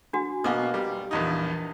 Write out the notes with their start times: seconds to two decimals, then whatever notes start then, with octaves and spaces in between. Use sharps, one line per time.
0.13 D4 F#4
0.44 B2 A#3 F5 D6 D#6
0.74 G3
1.11 A#1 E2 D#4